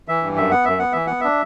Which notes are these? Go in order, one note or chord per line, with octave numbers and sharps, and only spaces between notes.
E3 E5
G2
F#2 E5
B3 F#5
F#2 E5
B3 F#5
E3 E5
B3 F#5
D4 E5